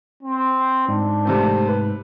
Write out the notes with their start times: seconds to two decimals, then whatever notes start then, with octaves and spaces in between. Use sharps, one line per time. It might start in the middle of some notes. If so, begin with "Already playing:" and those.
0.23 C4
0.88 G#2 D4
1.25 C3 A3 C4
1.68 B4